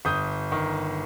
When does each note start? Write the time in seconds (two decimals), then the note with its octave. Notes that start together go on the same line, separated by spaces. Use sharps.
0.05 G1 D#6 G6
0.52 D#3